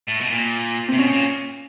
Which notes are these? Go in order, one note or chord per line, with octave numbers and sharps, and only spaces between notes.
A2
B2
A#2
C4
C3
B2 C#4
A#2